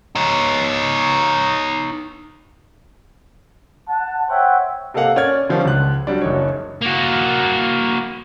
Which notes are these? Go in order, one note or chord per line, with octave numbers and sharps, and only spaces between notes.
D#4 C#5
F#5 A5
C5 C#5 E5 F#5 G5
C3 A#3 A4 D#5 F5 F#5
C#4 D5 F6 G#6
D3 D#3 F3 G3 C#4 D4
C#2 F#6
F#3 G3 D4
F#1 D#4 C#5
A#3 F#4